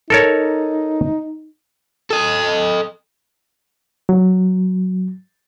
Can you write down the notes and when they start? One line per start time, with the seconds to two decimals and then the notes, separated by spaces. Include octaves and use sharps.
0.10 D#4 A4 A#4 C#5
2.11 A4 D#5
4.09 F#3